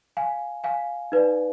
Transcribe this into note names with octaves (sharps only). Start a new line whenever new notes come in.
F5 G#5
F5 G#5
D#4 B4 D5